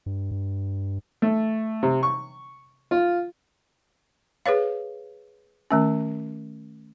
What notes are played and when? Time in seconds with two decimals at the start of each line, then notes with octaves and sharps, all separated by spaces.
0.06 G2
0.31 G2
1.22 A3
1.83 C3
2.03 C#6
2.91 F4
4.46 G#4 B4 C#5 F5
5.71 D#3 A3 C#4